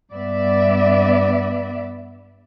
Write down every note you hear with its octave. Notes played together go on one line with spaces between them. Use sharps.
G2 B3 D5 E5